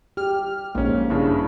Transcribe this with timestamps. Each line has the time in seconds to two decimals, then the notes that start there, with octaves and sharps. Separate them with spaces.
0.17 G4 F6
0.75 A#1 G#2 A#3 C#4
1.10 G2 C#3 D4 E4